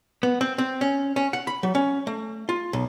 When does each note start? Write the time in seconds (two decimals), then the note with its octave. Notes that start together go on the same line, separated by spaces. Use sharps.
0.23 B3
0.41 C4
0.58 C4
0.81 C#4
1.16 C#4
1.33 F#5
1.47 B5
1.63 F#3
1.75 C#4
2.07 A3
2.49 F4
2.73 B1